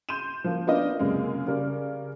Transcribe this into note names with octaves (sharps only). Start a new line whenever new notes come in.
C6 G6 D#7 E7
F3 A#3
B3 D4 F4 A#4 D5 D#5
C#2 F#2 C3 G#3 A#3
C#3 G3 A#4 D5